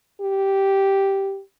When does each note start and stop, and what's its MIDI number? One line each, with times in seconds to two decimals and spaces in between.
0.22 1.41 67